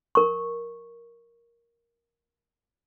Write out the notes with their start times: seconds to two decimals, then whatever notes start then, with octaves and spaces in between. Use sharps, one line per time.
0.15 A#4 C#6